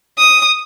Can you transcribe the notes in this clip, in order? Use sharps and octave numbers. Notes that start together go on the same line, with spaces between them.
D#6